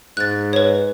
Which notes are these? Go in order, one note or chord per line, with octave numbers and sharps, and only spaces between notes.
G#2 F#6 A6
B4 C#5